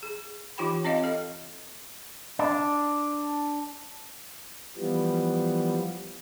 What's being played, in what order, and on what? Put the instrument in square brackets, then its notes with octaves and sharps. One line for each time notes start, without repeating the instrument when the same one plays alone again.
[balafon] G#4
E3 D#4 F4 G4 G5 B5
C4 C#5 D#5 F5 G5
A4 D#5
[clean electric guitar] D4
[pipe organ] E3 F3 G3 B3